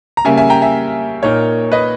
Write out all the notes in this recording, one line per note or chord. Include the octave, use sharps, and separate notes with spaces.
A#5
C#3 G3 A#3 E5 G#5
E5 G#5
G5 A#5
E5 G#5
A#2 A#3 D#4 A#4 C#5
B4 D#5